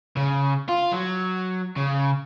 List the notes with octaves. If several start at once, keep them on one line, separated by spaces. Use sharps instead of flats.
C#3
F4
F#3
C#3